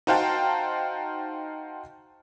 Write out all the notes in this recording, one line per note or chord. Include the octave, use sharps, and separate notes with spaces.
D#4 F#4 C5 F5 G5 A5